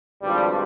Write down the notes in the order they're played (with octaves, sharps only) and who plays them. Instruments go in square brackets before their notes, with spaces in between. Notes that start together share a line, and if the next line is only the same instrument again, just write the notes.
[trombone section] G#1 G2 F3 G3